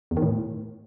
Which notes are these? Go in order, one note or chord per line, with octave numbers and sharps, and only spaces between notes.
E2
D#3
A2